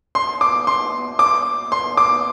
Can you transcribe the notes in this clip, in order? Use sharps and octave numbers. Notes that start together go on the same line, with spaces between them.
C6
D6
C6
D6
C6
D6